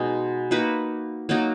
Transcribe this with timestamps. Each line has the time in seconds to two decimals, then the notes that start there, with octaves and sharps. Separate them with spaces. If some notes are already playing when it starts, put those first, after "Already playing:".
Already playing: B2 G#3 D#4
0.51 A#3 D#4 F#4 B4
1.29 F#3 A#3 D#4 F#4